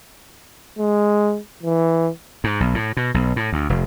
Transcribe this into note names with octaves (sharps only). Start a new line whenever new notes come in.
G#3
E3
G#2
B1
A2
B2
B1
A2
D2
F1